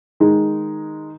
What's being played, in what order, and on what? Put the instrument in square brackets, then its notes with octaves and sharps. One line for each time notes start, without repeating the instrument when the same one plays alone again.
[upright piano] D#3 G#3 D#4